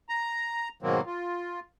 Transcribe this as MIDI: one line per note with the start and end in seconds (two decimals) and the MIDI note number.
0.09 0.69 82
0.82 1.01 44
0.82 1.01 47
0.82 1.01 51
0.82 1.01 54
0.82 1.01 58
0.82 1.01 60
1.06 1.60 65